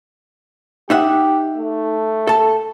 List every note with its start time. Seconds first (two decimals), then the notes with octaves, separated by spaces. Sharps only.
0.90 D#4 G4 E5 F#5
1.58 A3
2.27 A4 A5